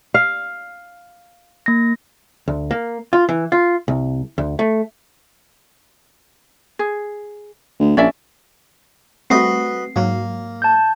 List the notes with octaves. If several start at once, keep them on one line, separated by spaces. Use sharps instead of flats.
F5
A#3 A#6
D2
A#3
F4
E3
F4
C2
D2
A3
G#4
D2
A#1 C#4 D5 E5
G3 A3 C4 F#4 B4 D#5 C7
G#2 F#3 A#3
A5 G6